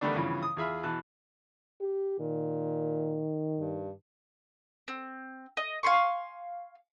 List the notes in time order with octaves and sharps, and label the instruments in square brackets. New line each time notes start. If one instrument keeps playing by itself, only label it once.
[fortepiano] D3 D#3 G3 A3 B3 D4
G2 C#3 E3 F3 B3
D#6
E2 F4 G#4 E5 B5 F6
B2 E3 A5 F#6
[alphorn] G4
[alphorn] A#2 [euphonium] D#3
[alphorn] G2
[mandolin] C4
D#5
F5 G#5 C6 C#6